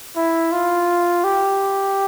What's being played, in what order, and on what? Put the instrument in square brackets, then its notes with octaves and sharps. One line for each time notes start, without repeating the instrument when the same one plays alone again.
[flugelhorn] E4
F4
G4